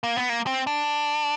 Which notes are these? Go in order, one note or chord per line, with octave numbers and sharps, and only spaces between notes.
A#3
B3
A#3
C4
D4